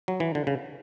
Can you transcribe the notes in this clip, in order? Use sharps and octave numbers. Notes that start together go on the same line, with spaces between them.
F#3
E3
D3
C#3